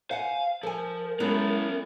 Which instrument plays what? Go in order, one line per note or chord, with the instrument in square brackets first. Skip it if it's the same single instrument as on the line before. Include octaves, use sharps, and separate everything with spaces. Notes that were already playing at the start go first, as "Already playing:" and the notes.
[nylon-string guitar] C5 F#5 [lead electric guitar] F5 [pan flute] G#5
[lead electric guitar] F3 [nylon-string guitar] A4 G#5 [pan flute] A#4
[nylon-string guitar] F#3 B3 E4 [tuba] G#3 [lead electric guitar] C#4 A4